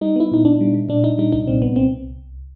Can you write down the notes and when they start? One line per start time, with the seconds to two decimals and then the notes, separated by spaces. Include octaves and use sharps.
0.01 G3 D#4
0.16 B3 E4
0.32 A#2 D#4
0.45 A#2 D4
0.61 G3
0.74 G3
0.89 A#2 D4
1.03 A#2 D#4
1.18 G3 D#4
1.32 C2 D#4
1.47 A#2 C4
1.62 C2 B3
1.76 C4